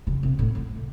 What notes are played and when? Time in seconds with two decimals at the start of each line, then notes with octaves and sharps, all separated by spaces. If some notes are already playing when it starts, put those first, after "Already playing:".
0.07 C#3
0.23 C3
0.39 A2
0.55 G#2